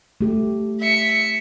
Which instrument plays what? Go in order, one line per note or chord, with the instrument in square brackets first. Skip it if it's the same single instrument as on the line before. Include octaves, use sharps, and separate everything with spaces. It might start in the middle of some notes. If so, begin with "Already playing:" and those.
[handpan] A3 G4
[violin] E5 C#7